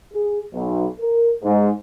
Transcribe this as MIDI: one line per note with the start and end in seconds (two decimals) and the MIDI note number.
0.14 0.39 68
0.53 0.84 35
0.99 1.29 70
1.44 1.69 44